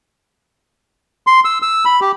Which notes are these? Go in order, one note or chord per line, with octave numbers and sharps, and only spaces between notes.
C6
E6
E6
B5
G4